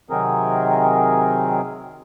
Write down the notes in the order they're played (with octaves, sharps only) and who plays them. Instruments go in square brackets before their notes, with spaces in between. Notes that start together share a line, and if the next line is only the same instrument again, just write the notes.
[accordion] C3 D#3 F#3 C4 G#4 A#4